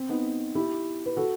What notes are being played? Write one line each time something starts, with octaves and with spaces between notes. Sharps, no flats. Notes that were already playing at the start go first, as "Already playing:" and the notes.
Already playing: C4
B3 D#4
E4 G4
B4
F#4 A4